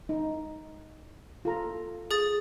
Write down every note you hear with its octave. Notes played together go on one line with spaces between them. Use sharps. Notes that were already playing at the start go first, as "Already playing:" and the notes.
D#4
F4 A4 A#5
G#4 D#6 A6